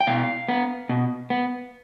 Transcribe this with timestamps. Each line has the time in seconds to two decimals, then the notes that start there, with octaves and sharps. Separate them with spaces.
0.01 G5
0.07 B2 F5
0.49 B3
0.89 B2
1.30 B3